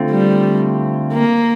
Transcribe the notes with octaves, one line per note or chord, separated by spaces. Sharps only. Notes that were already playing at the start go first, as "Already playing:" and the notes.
Already playing: D3 A3 C4 F4
G3
A#3